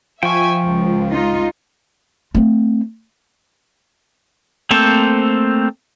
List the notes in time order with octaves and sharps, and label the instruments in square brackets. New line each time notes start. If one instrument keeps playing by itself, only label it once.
[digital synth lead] F3 [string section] E5 G#5 [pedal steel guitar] G5 C#6
[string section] C#2
[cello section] D#4 F4
[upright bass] A3 C4
[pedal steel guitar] A3 A#3 C4 A4 C5